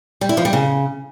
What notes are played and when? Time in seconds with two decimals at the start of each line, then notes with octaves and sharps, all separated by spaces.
0.21 G3
0.29 E4
0.37 F3
0.45 G3
0.53 C#3